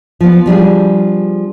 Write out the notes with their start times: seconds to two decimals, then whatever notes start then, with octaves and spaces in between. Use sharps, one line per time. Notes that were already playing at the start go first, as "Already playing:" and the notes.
0.21 F3 B3
0.46 F3 G3 D4 G#4